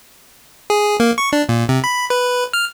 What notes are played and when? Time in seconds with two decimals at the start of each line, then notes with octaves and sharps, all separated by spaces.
0.70 G#4
1.00 A#3
1.18 C#6
1.33 D4
1.49 A#2
1.69 C3
1.84 B5
2.10 B4
2.53 F6